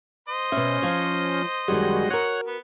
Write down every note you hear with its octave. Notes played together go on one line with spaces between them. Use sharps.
C5 D#5
B2 C#4 E5
F3 F4 C#5
F#2 D#3 G3 G#3 F#4
F#4 A#4 C#5 F#5
B3